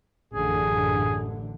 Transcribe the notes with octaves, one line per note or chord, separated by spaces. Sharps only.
A1 F#2 D3 G#4